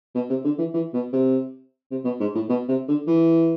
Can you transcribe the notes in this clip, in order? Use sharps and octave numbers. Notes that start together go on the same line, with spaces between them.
B2
C3
D3
E3
E3
B2
C3
C3
B2
G#2
A2
B2
C3
D3
E3